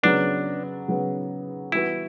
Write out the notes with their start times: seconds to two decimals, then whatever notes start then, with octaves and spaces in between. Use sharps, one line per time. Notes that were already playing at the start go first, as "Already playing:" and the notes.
0.03 C#3 F#3 B3 D4
0.88 C#3 F#3 B3
1.72 E3 G3 B3 E4 F#4 B4